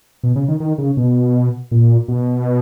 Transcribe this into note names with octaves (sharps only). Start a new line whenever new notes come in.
B2
C#3
D#3
D#3
C#3
B2
A#2
B2